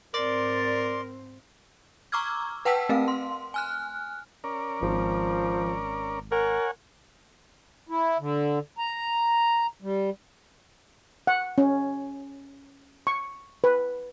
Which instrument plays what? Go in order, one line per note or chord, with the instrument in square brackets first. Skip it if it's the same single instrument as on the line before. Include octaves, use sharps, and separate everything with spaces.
[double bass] G#2 C4 [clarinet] A#4 [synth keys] D5 A6 [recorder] C6
[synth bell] A#5 C#6 D6 E6 F6 G#6
B4 F#5 G5 A5 E6 B6
A3 C4 A#4 F5
C6
G#5 F6 F#6
[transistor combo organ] C#4 A#4 D5
[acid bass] G#1 [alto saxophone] F3
[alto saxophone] A#4 [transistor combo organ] C#5 F#5 G#5
[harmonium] E4
D3
A#5
G3
[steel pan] F#5
C#4
C#6
B4